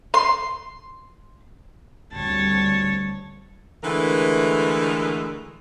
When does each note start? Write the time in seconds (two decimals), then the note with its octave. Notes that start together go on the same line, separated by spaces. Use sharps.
0.14 C6
2.13 D2 G3 C4 C#5 A5
3.82 D3 E3 G#3 A3 A#4 B4